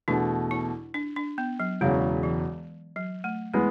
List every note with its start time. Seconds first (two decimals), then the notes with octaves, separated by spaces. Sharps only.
0.08 E2 B2 A3 D4
0.51 E4
0.94 D4
1.16 D4
1.38 B3
1.60 F#3
1.81 E1 E2 C#3 F#3 G#3
2.23 E3
2.96 F#3
3.24 A3
3.54 E3 G#3 A3 B3